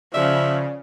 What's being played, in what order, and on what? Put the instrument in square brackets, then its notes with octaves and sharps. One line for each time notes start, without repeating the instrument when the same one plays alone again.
[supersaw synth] C#3 [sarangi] F3 [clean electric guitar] D5 [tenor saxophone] E5